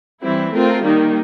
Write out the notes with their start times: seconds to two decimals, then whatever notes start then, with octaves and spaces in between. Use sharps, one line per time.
0.22 E3 G3 C4 E4
0.52 A3 C4 F4 A#4
0.82 D#3 G3 A#3 D#4